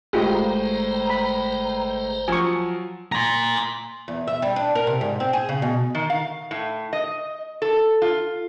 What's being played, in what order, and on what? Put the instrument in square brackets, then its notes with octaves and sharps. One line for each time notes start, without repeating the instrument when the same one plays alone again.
[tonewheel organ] G1 C5 A#5 [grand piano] A2 G#3 [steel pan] F4 G4 G#4
[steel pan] B5
[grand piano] F3 F#3 [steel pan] G#5 C#6
[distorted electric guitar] A#5 C6
[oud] E2
E5
G3
D4
A#4
C3
G#2
C4
G#4
C#3
B2
[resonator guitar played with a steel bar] D#3
F5
A2
D#5
A4
F4